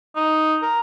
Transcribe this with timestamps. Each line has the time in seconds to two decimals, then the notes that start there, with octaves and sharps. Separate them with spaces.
0.16 D#4
0.62 A#4